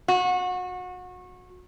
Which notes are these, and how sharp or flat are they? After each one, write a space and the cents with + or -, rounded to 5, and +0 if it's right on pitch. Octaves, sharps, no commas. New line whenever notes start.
F#4 -30